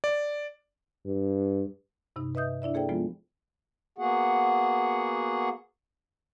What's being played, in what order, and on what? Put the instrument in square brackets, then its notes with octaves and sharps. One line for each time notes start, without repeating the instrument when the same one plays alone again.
[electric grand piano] D5
[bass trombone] G2
[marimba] G2 C3 D#4
B4 D#5 E5 D#6 G6
D4 E4 D5 E5
A#3 G#4 A4 C5 D5 G5
F3 G#3 A3 B3 F4
[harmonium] A#3 B3 F#4 G#4 F#5